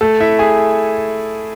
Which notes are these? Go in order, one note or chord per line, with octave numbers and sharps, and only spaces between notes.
A3 A4
E4 E5
G#4 G#5